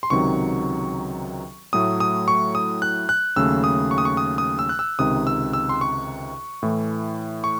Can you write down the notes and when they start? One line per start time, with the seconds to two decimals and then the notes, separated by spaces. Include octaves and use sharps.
0.03 C6
0.10 C#2 C3 D#3 F#3 C#6
1.73 A2 F#3 A3 D#6
2.00 D#6
2.28 C#6
2.55 D#6
2.82 F#6
3.09 F#6
3.36 D#2 C#3 F#3 A3 E6
3.64 D#6
3.91 C#6
3.98 D#6
4.05 C#6
4.17 D#6
4.38 D#6
4.59 E6
4.69 F#6
4.79 E6
4.99 C#2 C3 D#3 D#6
5.27 E6
5.53 E6
5.69 C6
5.81 C#6
6.63 A2 E3 A3
7.44 C#6